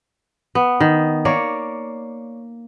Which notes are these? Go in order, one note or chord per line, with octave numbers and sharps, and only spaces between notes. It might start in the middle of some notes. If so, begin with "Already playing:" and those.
B3
D#3
A#3 C#5 D5